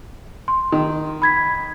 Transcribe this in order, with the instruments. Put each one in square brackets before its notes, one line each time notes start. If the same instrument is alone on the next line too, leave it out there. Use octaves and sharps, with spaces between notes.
[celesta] C6
[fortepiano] D#3
[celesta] B5 G#6 B6